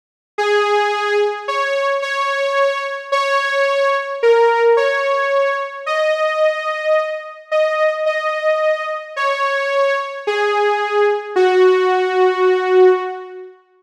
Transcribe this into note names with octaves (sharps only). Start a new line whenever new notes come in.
G#4
C#5
C#5
C#5
A#4
C#5
D#5
D#5
D#5
C#5
G#4
F#4